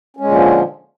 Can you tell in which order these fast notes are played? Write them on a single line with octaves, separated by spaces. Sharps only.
C#4 G#3 A#2 D3 F3